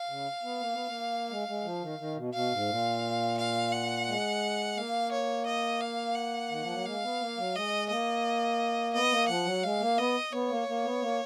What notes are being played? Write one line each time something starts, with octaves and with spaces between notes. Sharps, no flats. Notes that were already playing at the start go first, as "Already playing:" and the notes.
Already playing: F5
C#3
B3
A#3
B3
A#3
G#3
G#3
F3
D#3
D#3
B2
B2 F5
G#2
A#2
F5
F#5
G#3
A#3 F5
C#5
D#5
F5
F#5
D#3
F3
F#3
G#3 F5
B3
A#3
F#3
G#3 D#5
A#3 D#5
B3 D#5
A#3
F3 F#5
F#3
G#3 F5
A#3
B3 D#5
B3 C#5
A#3
A#3
B3
A#3